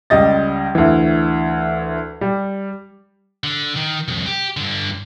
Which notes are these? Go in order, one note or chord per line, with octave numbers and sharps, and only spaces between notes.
C#2 G3 D#5 A6
D2 E3
G3
D3
D#3
C2 F2
G4
G2 D3